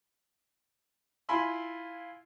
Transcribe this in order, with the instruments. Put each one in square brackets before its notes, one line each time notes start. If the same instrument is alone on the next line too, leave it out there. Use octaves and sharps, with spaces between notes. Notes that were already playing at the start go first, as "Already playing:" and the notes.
[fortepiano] E4 F4 G#5 B5 C6 E6